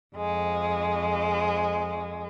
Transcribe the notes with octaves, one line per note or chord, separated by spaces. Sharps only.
F2 G#3